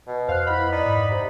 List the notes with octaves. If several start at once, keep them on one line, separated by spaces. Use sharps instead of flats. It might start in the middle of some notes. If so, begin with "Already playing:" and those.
B2
F2 C5 F5 F#6
B3 E4 D#5 B5
D#4 D5
G#2
C3